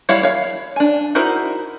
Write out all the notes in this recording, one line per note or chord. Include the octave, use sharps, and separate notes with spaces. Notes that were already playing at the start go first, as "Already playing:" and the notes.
G3 E4 C#5 F5 F#5
C#5 F5
D4 G#5
D#4 E4 F#4 A#4 C5